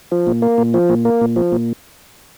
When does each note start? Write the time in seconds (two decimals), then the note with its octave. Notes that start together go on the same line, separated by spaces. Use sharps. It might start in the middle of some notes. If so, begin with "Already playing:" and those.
0.12 F3
0.27 A#2
0.42 A#3
0.58 A#2
0.74 F3
0.89 A#2
1.05 A#3
1.21 A#2
1.36 F3
1.52 A#2